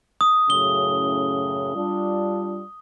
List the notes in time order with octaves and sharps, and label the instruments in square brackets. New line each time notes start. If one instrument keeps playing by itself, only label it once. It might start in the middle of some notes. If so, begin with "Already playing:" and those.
[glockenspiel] D#6
[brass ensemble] F#2 A2 C#3 [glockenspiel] G7
[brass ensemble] G3 D4 F4